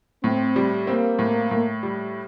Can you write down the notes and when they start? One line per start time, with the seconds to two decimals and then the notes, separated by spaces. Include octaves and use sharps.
0.23 A2 C4
0.56 G3
0.87 A#3 C4
1.19 A2
1.51 A2
1.83 G3